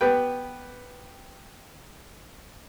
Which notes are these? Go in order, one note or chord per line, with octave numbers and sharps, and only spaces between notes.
B3 G4 B4 G5